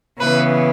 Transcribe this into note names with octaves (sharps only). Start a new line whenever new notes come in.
C#3 E3 B3 B4